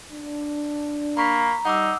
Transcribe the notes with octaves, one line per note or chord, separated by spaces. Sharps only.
D4
A#3 A#5 B5 C#6 B6
G3 D#4 F#5 D6 E6